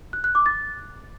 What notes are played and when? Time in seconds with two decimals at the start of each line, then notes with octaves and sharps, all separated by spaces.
0.13 F#6
0.24 F#6
0.35 D6
0.46 A6